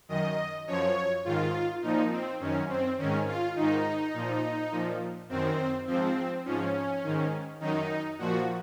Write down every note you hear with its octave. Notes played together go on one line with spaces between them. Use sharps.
F#2 D#3 D#5
F#2 F3 C#5
G#2 D#3 F4
A#2 F3 D#4
C4
F#2 D#3 C#4
C4
G#2 D#3 C#4
F4
G#2 D#3 D#4
A#2 F3
A#2 F3
F#2 D#3 C4
G#2 F3 C4
G#2 F3 C#4
G#2 D#3
F#2 D#3 D#4
A#2 F3 F#4